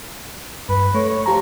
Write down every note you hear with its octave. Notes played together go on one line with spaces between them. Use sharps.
G2 B4
A3 C#5
C#5
F3 G4 A#5